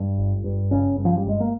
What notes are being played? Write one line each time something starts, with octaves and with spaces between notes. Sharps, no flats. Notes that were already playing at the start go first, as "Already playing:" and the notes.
Already playing: G2
G1
G2
G1 C#3 C#4
G2
F3
G3
G1 G#3
A#3